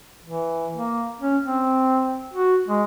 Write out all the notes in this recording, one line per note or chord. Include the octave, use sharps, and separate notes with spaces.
E3
A#3
C#4
C4
F#4
G#3